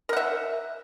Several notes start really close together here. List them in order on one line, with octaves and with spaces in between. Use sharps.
A#4 F#5 E5